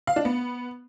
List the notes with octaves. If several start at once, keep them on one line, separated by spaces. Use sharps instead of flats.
F5
D4
B3